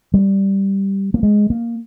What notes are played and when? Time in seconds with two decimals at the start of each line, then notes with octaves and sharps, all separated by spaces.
0.14 G3
1.14 A#3
1.23 G#3
1.50 A#3